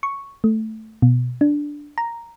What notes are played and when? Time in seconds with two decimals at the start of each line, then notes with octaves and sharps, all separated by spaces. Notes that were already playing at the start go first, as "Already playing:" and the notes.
0.03 C#6
0.44 A3
1.02 B2
1.41 D4
1.98 A#5